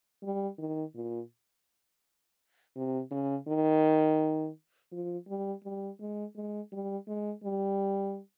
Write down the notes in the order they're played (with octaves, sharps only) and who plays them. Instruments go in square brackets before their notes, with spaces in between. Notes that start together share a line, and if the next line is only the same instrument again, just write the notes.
[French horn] G3
D#3
A#2
C3
C#3
D#3
F3
G3
G3
G#3
G#3
G3
G#3
G3